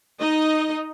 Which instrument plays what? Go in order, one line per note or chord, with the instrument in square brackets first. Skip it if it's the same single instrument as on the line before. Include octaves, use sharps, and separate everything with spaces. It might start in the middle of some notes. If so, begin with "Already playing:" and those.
[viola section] D#4 D#5